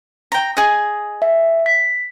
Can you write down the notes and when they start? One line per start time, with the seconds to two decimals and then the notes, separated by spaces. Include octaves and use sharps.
0.32 G5 A#5
0.57 G#4 D#5
1.22 E5
1.66 B6